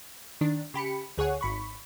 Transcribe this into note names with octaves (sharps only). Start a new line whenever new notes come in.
D#3 D4
C#3 G4 B5 C#7
D2 G#4 C#5 F#5
G#1 B5 C#6